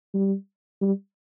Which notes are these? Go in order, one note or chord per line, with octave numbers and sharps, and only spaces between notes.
G3
G3